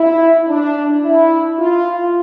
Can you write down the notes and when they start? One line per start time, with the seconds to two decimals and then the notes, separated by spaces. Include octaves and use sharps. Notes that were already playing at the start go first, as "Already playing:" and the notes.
Already playing: E4
0.47 D4
1.03 E4
1.58 F4